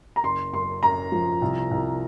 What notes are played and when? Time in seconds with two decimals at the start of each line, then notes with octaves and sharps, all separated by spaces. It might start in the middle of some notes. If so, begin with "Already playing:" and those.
0.16 A#5
0.23 F#1 C6
0.53 F#2 C6
0.83 F#2 A#5
1.12 F3
1.41 C2
1.71 C2